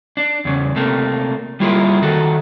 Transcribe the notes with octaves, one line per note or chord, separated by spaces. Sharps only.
D4
E2 C#3
C3 A3 A#3
G3 A#3 E4 F4 G#4 A#4
D#3 F#4 A4